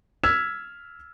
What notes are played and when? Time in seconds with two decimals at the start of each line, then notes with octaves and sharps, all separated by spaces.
0.23 E6 F6 G#6 B6 E7